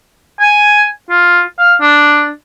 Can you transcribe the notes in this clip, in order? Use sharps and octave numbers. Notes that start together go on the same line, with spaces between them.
G#5
F4
F5
D4